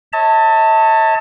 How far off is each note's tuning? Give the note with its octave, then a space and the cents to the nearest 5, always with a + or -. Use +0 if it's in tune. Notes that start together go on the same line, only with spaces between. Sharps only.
C#5 -10 E5 -45 A5 +20